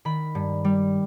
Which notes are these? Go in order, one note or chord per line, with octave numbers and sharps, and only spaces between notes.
D#3 B5
G2
G3